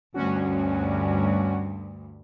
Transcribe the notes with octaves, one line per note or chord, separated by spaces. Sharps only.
D2 G2 C#4 F#4